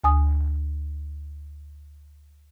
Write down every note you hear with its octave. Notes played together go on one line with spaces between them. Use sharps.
D2 G#5 D#6